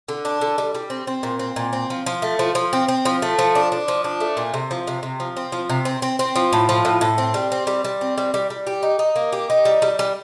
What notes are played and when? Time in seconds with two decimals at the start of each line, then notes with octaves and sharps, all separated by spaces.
0.09 D3
0.25 D4
0.41 D3
0.58 G3
0.75 G3
0.90 C4
1.07 C4
1.23 A#2
1.39 C4
1.56 A#2
1.73 C4
1.90 F3
2.06 F3
2.22 A3
2.39 F3
2.55 F3
2.73 C4
2.88 C4
3.05 F3
3.22 A3
3.39 F3
3.55 D4
3.72 D4
3.88 F3
4.04 D4
4.20 A3
4.37 A#2
4.54 C3
4.71 F3
4.87 C3
5.03 C3
5.20 F3
5.37 C4
5.52 F3
5.70 C3
5.85 C4
6.02 C4
6.19 C4
6.36 F3
6.53 A2
6.69 F3
6.85 A2
7.01 A2
7.18 C4
7.34 G3
7.52 C4
7.67 G3
7.84 G3
8.01 C4
8.18 G3
8.34 G3
8.50 G3
8.67 G4
8.83 D#4
8.99 D#4
9.16 A#3
9.32 G4
9.50 D#4
9.65 G3
9.82 G3
9.99 G3